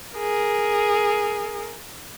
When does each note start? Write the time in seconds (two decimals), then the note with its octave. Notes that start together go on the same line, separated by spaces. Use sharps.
0.16 G#4 A#4